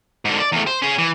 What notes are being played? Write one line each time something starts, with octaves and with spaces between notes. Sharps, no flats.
G#2 D3
D5
E2 A3
C5
C#4 G#4
E3